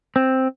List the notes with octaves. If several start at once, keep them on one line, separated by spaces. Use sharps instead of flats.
C4